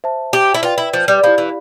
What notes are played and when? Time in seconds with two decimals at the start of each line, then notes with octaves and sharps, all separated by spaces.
0.04 C5 E5 A5
0.33 G4
0.54 E4
0.63 F4 B4 D5 G5
0.78 E4
0.93 F3
1.08 G3
1.23 F3 E4 G4 D5 F5 B5
1.38 E3